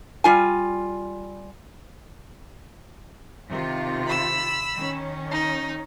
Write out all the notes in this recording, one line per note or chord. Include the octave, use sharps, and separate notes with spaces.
G3 F4 G#5
C3 D#3 F4
B5 E6
D#3 C#4
D#4